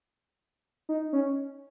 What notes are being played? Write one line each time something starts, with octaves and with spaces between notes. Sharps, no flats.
D#4
C#4